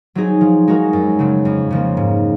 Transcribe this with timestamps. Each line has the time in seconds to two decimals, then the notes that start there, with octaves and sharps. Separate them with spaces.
0.15 F#3 C4 D#4 G#4
0.41 F3
0.68 G#3 D#4 F#4 A#4
0.93 F#2
1.19 C#3 F#3 C4
1.45 F2
1.71 C#3 F3 A#3
1.97 G#2